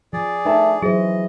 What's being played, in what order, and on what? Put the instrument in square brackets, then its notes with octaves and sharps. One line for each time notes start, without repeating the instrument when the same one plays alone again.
[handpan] F3 [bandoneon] G#4 D5
[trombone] A3 [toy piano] D4 D#4 A#5 [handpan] B4
[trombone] E3 [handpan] F#3 C5 [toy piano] G#4 [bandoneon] D#5